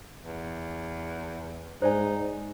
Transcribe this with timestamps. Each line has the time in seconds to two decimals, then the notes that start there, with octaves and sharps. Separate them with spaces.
0.23 E2
1.82 G#2 D#4 C5 D5 G#5